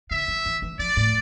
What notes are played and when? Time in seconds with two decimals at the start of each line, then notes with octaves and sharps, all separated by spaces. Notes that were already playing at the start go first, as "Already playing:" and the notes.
0.11 D3 E5
0.28 E3
0.46 E3
0.62 E3
0.79 F3 D5
0.97 A2